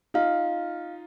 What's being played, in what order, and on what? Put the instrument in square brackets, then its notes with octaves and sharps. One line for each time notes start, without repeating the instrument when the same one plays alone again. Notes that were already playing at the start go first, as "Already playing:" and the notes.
[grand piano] D#4 F4 [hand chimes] F5